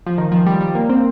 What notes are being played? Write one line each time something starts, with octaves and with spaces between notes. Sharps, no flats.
F3
D#3
F3
G3
G3
A#3
C4